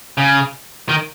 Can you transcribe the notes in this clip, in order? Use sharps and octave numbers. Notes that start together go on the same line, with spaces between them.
C#3
D#3